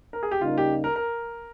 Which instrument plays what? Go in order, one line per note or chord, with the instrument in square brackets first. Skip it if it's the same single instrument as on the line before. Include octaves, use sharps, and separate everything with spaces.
[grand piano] A#4
G#4
G4
[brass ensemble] C#3 G3 A#3 D#4 [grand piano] F4
[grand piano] G4
A#4
A#4